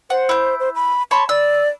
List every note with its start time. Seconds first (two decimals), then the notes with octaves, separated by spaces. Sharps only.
0.10 C5 F#5
0.29 E4 G6
0.60 C5
0.75 B5
1.11 C#5 A5 B5 C6
1.29 D5 E6